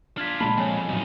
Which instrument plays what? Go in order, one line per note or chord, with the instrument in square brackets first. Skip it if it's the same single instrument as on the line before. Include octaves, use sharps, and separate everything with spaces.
[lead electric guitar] D4 F4 [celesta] F6 G#6 B6
[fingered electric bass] A#2 G#3 A#3 [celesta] A5 B5 F#7
[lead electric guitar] F2 [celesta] C#5 G#5
[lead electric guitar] C2 D#4 [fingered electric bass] A2 F3 F#3